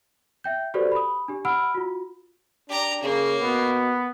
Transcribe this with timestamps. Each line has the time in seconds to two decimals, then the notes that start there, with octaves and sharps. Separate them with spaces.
0.44 E5 G5 G6
0.74 F#4 G4 A4 B4 C5 D5
0.92 B5 D#6
1.28 D4 G4
1.45 F#5 B5 E6 F6 D7
1.75 F4 F#4
2.69 D4 G4 A#5
3.03 C#3 A#3
3.42 B2 B3